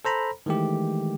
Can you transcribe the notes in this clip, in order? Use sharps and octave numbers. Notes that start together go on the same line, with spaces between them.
A4 C5 A#5 B5
D#3 E3 G#3 A3 G4